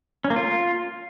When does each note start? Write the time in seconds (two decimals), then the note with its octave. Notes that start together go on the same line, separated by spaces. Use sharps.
0.24 C#4
0.30 A#3
0.36 F4